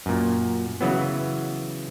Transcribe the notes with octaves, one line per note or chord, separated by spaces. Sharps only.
F#2 A#2
C#3 E3 F#3 B3